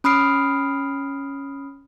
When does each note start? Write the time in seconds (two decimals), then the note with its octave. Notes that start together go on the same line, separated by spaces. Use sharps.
0.04 C#4 B5 D#6 F6 C7 D7